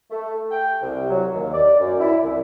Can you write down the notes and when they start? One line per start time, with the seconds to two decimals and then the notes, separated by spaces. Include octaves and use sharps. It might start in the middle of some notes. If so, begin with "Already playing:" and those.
0.11 A3
0.51 G5
0.81 C2
1.10 F#3
1.33 D#2
1.53 D5
1.80 F#2
1.99 E4
2.22 C2